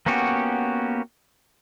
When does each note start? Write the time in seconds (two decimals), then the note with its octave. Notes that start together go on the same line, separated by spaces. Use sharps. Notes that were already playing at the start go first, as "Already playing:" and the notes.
0.06 A#3 B3 C#4 F#4 G4